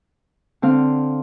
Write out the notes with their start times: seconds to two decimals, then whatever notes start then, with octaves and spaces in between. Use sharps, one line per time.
0.62 D3 C4 F5